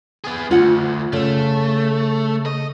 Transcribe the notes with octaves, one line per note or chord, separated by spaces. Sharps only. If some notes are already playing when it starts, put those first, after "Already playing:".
B3 G#4
D2 F4 F#5
C#3 A3
D#5